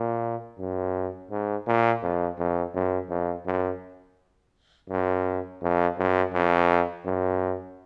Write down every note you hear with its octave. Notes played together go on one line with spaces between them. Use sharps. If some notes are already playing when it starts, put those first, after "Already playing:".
Already playing: A#2
F#2
G#2
A#2
F2
F2
F#2
F2
F#2
F#2
F2
F#2
F2
F#2